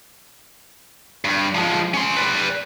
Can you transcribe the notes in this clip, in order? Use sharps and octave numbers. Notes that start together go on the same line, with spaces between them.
G2
F3 G#3
C#4 C6
B4 D5